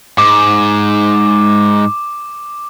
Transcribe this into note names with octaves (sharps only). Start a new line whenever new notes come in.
G#2 D6